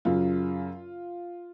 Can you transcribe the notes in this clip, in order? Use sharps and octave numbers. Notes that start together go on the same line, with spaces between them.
F#2 C#3 F4